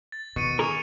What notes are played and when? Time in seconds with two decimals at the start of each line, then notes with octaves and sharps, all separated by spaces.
0.12 A6
0.36 B2 D3 D#3 C#6 C#7 D#7
0.59 G#4 A#4 C#6 F7